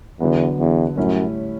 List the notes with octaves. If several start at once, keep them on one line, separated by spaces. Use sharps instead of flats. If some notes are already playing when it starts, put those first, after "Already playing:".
E2 D3 F#3 B3
E2
F#2 A2 G3 C#4 E4